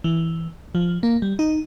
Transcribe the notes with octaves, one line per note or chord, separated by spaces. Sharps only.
E3
F3
A#3
G3
D#4